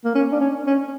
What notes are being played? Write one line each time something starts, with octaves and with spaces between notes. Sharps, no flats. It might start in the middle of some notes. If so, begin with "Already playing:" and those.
A#3
C#4
D4
C#4
C#4